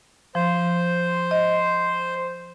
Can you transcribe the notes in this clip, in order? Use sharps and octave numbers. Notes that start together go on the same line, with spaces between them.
F3 C5
D#5